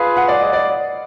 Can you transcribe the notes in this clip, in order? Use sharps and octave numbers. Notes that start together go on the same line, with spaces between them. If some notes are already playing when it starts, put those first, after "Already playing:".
Already playing: F4 G#4 B4 F5
F#5
D5
D#5
D5